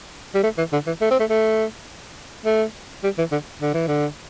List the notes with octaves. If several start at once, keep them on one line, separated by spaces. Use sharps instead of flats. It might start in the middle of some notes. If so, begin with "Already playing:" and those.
G3
A3
E3
D3
E3
A3
C4
A3
A3
A3
G3
E3
D3
D3
E3
D3